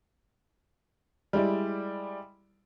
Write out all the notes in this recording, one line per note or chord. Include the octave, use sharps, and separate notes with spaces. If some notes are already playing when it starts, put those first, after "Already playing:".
G3 G#3 E4 D5